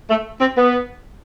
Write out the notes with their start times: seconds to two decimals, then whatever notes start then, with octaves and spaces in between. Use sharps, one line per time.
0.10 A3
0.40 C4
0.56 B3